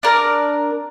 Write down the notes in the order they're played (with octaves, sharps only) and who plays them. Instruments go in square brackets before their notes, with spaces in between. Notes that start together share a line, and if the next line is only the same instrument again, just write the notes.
[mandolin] D4 A#4 D5